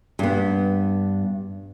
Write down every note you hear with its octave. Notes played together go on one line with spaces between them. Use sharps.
G2 B3